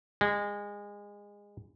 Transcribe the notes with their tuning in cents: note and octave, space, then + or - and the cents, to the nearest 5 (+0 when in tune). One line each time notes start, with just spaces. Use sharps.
G#3 -25